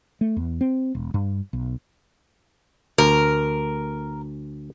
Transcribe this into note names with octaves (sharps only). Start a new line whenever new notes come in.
A3
E2
C4
E1
G2
B1
D2 A#4